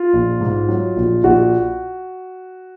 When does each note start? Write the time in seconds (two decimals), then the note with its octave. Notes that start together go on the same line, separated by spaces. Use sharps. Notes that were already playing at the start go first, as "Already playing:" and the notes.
Already playing: F4
0.13 A#1
0.41 G#2
0.69 F#3
0.96 A#1
1.24 A#1 F#4